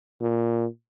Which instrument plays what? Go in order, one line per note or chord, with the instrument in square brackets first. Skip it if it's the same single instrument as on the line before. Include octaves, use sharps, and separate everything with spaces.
[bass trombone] A#2